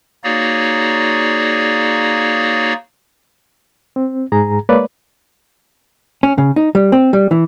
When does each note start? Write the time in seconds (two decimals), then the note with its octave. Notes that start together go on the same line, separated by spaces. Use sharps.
0.24 A#3 D#4 F#4 G#4 C#5 D5
3.96 C4
4.32 G#2 G#4 A#5
4.69 G#3 A#3 B4 C#5 D5
6.23 C#4
6.38 C#3
6.56 D#4
6.75 G3
6.92 C4
7.13 G3
7.31 E3